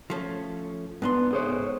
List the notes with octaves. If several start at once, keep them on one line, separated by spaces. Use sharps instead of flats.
F3 A3 C#4
G#2 B3 D4 C6
G#4 C5 C#5